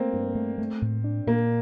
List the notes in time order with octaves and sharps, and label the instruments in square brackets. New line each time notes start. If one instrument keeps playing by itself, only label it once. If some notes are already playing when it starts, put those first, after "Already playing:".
Already playing: [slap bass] A3 [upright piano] A#3 C4
[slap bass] G2
A3
A3
A2
D4
[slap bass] A#2 [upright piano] A#3